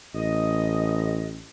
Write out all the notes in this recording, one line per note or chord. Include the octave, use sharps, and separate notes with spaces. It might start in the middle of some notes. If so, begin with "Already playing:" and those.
A1 D#5